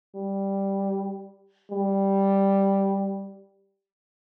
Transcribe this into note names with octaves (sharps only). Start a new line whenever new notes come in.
G3
G3